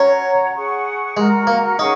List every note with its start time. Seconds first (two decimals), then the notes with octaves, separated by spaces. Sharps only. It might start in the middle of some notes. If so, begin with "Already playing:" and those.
Already playing: C#4 F#4 C#5 F#5 A#5
0.55 G#4 F#5 C#6
1.17 G#3 F#4 A#4 F#5 A#5
1.47 A#3
1.78 C#4 D#4 G#4 F#5 C#6